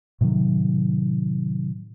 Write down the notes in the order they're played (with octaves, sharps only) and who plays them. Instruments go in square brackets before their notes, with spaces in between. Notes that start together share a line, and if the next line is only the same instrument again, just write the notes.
[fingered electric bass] A2 C3 D#3 F#3